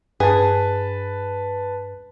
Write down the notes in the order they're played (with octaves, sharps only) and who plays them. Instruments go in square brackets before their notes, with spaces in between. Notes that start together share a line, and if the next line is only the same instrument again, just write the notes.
[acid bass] G2 [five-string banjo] G#4 [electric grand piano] B4 A5